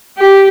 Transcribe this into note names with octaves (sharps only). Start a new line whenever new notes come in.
G4